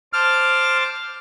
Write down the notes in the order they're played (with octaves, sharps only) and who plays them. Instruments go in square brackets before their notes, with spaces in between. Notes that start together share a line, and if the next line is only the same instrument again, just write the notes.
[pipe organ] C5 A5 D6 [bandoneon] F6